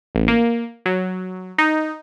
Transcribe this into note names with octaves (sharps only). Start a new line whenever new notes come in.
A1
A#3
F#3
D#4